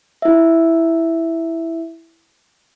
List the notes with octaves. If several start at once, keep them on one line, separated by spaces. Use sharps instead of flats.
E4 E5